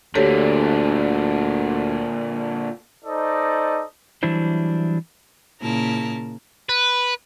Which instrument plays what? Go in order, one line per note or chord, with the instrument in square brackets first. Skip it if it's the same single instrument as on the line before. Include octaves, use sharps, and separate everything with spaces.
[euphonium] D2 [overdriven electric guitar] A#2 D3 [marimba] G4 A4 C#5
[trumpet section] D#4 A4 C5 D5 D#5
[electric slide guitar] E3 F#3 G3 D4 E4 C5
[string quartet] A#2 C#3 E4 A#4 A5
[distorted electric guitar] B4